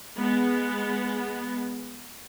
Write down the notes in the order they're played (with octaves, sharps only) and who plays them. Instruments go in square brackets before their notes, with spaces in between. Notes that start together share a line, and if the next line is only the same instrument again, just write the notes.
[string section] G#3 B3